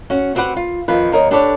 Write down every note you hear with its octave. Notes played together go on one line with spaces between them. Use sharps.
C#4 F#4
B3 C4 F#4 G4 B4 F#5
F4
F2 D#3 F3 B4
D#2 A#4 C#5 D#5
D4 G4 A4 B4 C#5 D5